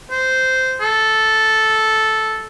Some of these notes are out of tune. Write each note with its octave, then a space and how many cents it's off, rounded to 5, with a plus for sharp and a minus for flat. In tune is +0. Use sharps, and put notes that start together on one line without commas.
C5 -10
A4 -5